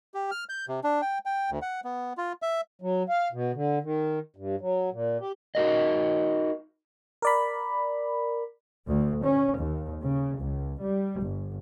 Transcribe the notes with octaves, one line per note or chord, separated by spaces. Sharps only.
G4
F6
G6
C3
D4
G5
G5
D2
F#5
B3
F4
E5
F#3
F5
B2
D3
D#3
G2
F#3
A#2
G4
D#4 F#4 A#4 D#5
A#4 D5 B5
D2
C#4
D#2
C#3
C#2
G3
G1